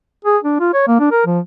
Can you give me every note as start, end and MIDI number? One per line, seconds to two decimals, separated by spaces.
0.25 0.38 68
0.44 0.57 62
0.60 0.70 65
0.74 0.85 73
0.88 0.99 58
1.00 1.10 62
1.11 1.22 70
1.26 1.40 53